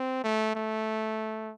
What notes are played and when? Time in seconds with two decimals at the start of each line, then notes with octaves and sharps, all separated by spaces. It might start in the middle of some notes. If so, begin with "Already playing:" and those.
Already playing: C4
0.24 A3
0.55 A3